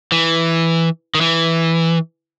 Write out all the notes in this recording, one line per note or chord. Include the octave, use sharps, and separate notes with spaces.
E3
D#3
E3